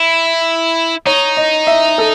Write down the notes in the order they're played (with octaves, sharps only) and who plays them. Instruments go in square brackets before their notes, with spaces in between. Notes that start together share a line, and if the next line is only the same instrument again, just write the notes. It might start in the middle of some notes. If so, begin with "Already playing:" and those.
Already playing: [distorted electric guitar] E4
[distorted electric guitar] D#4 [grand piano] C#5
[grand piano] D#5
E5
A4